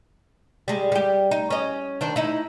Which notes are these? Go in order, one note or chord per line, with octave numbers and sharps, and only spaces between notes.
G3 G#3
G3 G4
D#4
C#4 D#5
D#3 D4 C5
D#4 E4